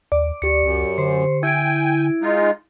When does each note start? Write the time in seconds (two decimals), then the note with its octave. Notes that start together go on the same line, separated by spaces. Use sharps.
0.12 D#2 D5
0.42 D2 G4 C#7
0.63 C#2 F#2
0.98 D3 C5
1.43 E4 G5 G#5 G#6 D7
2.22 G#3 D#4 F4